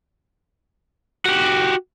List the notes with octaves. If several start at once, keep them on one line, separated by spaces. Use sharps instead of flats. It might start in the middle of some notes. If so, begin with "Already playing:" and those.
F#4 G4